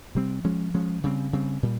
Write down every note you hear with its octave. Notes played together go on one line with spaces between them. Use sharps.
C3 G3 C4
F3 G#3 C#4
F3 G#3 C#4
C#3 G3 C4
C#3 G3 C4
A#2 G3